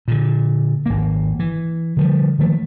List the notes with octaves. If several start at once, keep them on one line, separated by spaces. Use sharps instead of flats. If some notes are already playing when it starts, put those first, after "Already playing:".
A#2 D3
G#1 A#3
E3
D3 F3 G3
D#3 F3 A3